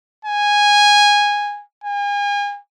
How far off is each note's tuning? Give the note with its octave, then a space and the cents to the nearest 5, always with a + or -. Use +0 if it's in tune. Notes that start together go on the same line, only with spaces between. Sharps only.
G#5 -10
G#5 -35